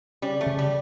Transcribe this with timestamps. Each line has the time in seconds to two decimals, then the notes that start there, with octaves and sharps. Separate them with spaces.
0.22 C#3 G3
0.41 A3
0.46 C#3
0.58 G3